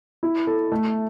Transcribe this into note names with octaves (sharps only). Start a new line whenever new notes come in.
E4
A4
A3